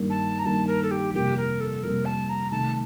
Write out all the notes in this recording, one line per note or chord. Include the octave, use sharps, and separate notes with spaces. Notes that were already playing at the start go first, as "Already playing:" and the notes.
Already playing: G2 D#3 A#3
A5
A#5
G2 D#3 A#3 A5
A#4
A4
G4
F2 C3 G3 A#3 G4
A#4
A4
F2 C3 G3 A#3 A#4
A5
A#5
C3 D#3 A3 A5